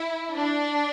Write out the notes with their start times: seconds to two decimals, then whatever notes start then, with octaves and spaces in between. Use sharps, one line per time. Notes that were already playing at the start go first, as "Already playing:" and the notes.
Already playing: E4
0.35 D4